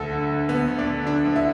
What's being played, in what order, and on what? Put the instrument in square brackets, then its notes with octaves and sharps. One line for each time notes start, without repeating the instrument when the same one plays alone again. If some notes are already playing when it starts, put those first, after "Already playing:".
Already playing: [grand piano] D2 A4
D3
D3
D2 B3
D2
D4
D3
D3 D4
D2
E4